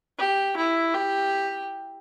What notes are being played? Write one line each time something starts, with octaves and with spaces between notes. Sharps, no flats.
G4
E4
G4